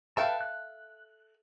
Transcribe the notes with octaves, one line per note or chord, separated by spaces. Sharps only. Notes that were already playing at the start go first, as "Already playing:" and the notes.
A4 B4 E5 F5 G5 A5
F#6